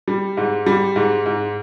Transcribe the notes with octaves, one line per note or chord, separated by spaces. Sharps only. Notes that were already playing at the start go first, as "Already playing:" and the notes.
G3
G#2
G3
G#2
G#2